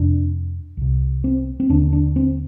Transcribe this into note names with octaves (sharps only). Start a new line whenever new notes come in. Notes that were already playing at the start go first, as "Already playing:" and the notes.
Already playing: F2 C3 D4
C2 C3
C4
C4
D#2 D3 D4
D4
C4